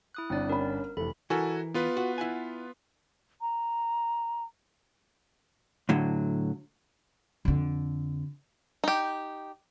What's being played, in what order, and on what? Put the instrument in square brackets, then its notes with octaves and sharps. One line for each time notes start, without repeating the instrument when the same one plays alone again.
[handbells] E4 D#6 F#6
[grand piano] G1 D4 [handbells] C4 D5
[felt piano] C#4 B5 [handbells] A#4
[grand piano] F1 E3 [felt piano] A4 [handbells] B5
[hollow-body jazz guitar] E3 E4 A#4 [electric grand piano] F#4 A4 G#5
[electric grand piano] B3 F4 B4
[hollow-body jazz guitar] F#4
E4 F#5 G#5
[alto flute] A#5
[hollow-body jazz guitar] A2 D3 F#3
[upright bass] F2 D3
[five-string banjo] D#4 G4